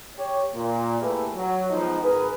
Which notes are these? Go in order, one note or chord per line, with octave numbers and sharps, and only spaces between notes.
G4 C#5
A#2
A3 A#3 E4 G4 G#4 B4
F#3
F3 G#3 B3 D#4
G#1 G#4 A#4 B4